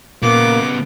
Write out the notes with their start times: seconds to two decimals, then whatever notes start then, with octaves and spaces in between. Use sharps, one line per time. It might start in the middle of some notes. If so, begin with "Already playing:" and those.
0.23 A#2 C#3 A#3 B3 D6